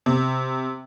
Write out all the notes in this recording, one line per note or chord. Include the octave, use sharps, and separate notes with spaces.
C3